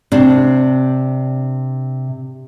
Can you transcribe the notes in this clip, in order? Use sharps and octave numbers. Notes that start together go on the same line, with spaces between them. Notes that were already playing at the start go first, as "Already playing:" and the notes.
C3 D4